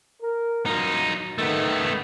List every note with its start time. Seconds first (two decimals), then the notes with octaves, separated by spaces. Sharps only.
0.22 A#4
0.66 F#3 D#4 F4
1.38 D#3 A3 B3